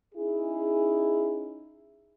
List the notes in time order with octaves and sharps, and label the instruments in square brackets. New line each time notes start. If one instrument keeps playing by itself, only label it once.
[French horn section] C#4 D#4 E4 G#4